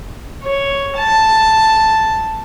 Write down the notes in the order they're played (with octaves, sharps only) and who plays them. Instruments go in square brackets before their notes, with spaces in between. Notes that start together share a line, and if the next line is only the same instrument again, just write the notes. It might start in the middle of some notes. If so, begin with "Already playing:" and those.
[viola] C#5
A5